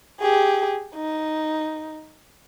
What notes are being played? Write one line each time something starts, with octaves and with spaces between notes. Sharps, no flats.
G4 G#4
D#4